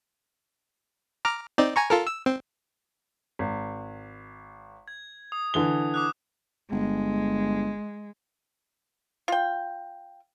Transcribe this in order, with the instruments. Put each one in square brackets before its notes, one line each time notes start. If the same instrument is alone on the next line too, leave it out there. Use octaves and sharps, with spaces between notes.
[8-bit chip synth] A#5 D6 F6
C4 D#4 D5
G#5 A#5 C#6
F4 A4 A#4
E6
C4
[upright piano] G#1
[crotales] G#6
D#6
[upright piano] D3 E3 G7
[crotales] D6 D#6 F#6
[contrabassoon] G1 [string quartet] G#3
[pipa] F4 G5